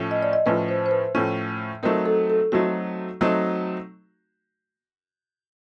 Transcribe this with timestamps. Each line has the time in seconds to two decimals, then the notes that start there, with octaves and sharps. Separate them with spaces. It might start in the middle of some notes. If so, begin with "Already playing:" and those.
Already playing: A2 F3 A3 C#4
0.11 D#5
0.23 D5
0.33 D#5
0.46 A2 F3 A3 C#4 B4
0.68 C5
0.86 C5
0.91 B4
1.15 A2 F3 A3 C#4
1.83 F#3 A3 C4 D#4 A#4
2.06 A4
2.30 A4
2.52 F#3 A3 C4 D#4 F#4
3.21 F#3 A3 C4 D#4